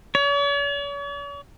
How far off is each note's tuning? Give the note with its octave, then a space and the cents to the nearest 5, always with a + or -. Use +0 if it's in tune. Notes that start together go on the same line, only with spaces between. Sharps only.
C#5 +45